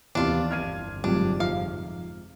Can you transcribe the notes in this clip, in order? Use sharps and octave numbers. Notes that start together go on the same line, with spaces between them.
D#2 C3 E3 B3 D4 F4
G1 F2 F6 G#6 D#7
G#2 C3 F#3 G3 D4 F4
F3 F5